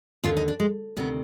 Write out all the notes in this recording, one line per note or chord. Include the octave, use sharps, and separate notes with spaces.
D#2 D3 F4
D#4
D4
G#3
D2 C3 D#3 B3